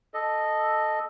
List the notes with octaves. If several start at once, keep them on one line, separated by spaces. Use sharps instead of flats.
A4 D#5